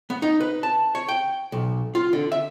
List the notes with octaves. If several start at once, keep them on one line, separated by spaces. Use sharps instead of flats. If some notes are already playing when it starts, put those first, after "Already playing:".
B3
D#4
B4
A5
C#5
G5
B1
F4
D3
E5